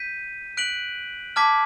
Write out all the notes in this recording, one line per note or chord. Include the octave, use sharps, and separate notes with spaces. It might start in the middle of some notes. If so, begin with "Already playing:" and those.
Already playing: G6 B6 D#7
F#6 B6 D7 F#7
A5 D6 F6 G#6 B6